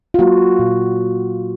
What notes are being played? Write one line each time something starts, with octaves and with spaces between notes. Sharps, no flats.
F4
F#3 A#3 F#4
A#2